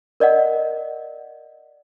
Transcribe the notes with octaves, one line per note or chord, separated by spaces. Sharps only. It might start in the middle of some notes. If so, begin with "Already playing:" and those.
A#4 D5 D#5 F#5